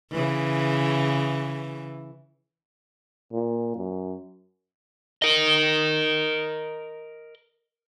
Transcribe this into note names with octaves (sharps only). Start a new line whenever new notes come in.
C#3 E3
A#2
F#2
A#4 D#5